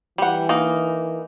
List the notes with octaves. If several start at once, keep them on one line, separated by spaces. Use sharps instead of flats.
E3 G3 F#5
A#3 D#4